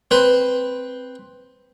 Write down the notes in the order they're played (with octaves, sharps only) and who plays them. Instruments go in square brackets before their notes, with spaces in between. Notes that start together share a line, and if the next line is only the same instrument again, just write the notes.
[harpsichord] C4 B4